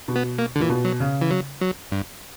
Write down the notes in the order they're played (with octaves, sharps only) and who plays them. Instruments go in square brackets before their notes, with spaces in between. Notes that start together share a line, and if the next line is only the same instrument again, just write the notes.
[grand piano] B2
[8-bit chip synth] B3
A#3
D3
[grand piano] A#2 [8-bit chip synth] E3
[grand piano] B2
[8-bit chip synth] F#3
[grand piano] C#3
[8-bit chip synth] E3
F#3
F#3
G2